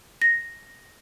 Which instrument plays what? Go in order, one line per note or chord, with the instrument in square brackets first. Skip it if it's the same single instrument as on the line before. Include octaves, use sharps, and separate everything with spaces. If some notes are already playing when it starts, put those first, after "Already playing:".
[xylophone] A#6